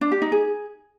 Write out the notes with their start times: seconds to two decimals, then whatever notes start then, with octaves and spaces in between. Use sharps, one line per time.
0.01 D4
0.12 G4
0.22 D#4
0.32 G#4